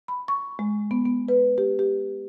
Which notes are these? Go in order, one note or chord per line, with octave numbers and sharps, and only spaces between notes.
B5
C#6
G#3
B3
B3
B4
G4
G4